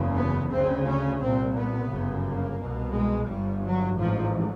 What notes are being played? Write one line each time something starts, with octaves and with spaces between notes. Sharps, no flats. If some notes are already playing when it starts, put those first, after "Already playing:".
Already playing: F#1 E2 C#3
B3
D2 C#3 C4
C#4
C2 A#2 C4
B3
G1 F#2 C#3
A#3
C2 B2
G#3
G1 G2 G3
F#3
A1 G#2 F3